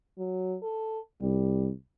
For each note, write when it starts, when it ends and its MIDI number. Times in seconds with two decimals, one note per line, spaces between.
0.18 0.56 54
0.62 1.00 69
1.21 1.70 36
1.21 1.70 55